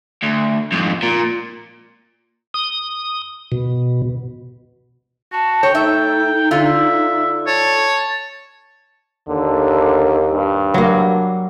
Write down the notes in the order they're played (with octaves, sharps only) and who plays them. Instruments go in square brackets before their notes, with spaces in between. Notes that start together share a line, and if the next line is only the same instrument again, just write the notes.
[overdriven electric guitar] D2
F2 G#2
A#2
[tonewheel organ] D#6
B2
[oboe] F#4 [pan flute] A5
[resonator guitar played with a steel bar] C#5 [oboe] G5
[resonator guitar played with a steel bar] A3 E5 [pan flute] D#4
[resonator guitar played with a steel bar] D3 F4 [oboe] E5
[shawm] C#5 [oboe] A5
[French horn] D#2 [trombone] D3
[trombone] G2
[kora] F#3 A#3